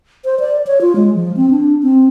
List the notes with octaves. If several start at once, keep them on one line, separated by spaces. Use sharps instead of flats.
C5
D5
C#5
F4
G#3
F3
C4
D4
C4